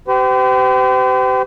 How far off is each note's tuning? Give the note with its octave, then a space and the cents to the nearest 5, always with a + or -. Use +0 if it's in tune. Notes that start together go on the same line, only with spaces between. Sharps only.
G4 -30 C5 -45